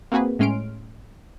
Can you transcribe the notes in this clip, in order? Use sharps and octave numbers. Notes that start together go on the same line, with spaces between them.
A#3 C4 F#4 G#4 B4
A2 G#3 C#4 C6 F6 D7